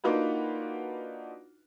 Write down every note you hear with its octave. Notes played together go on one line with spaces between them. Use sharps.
A#3 D4 D#4 F4 F#4 B4